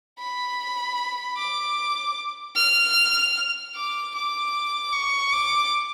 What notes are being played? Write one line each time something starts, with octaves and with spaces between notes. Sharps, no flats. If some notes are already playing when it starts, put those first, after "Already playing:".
B5
D6
F6
D6
D6
C#6
D6